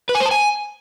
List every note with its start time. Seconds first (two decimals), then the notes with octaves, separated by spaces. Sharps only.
0.09 B4
0.15 G#5
0.20 C5
0.26 A5
0.31 G#5